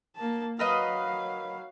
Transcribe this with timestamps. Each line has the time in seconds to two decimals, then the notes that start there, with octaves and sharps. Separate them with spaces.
0.16 A#3 A5
0.59 F#3 A#4 B4 D#5 F5